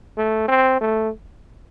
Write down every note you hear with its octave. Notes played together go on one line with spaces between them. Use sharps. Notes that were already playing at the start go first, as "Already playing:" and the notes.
A3
C4
A3